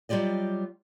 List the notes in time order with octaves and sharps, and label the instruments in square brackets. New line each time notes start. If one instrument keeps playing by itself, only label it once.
[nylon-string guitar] F#3 G3 F4 G4 D5 D#5